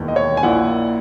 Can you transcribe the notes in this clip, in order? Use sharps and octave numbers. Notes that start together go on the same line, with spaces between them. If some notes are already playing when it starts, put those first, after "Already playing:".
Already playing: E1 D#2 D#3
D#5
C#5
G#5
A#1 A#2 A#3 E4 F#5